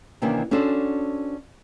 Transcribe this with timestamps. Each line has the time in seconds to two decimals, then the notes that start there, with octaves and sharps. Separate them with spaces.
0.22 C3 D#3 E3 A#3 C#4 D4
0.51 C#4 D4 F#4 A4 C5